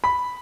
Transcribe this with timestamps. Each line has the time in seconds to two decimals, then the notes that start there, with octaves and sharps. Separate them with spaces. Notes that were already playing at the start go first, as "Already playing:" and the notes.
0.04 B5